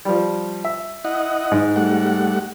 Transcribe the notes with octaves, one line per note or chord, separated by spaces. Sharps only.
F3 G3
E5
E4 D#5 F#5
G#2
G3 A3 F#5